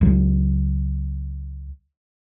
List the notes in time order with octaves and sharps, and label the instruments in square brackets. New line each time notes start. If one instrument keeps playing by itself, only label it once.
[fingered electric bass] C#2 F#3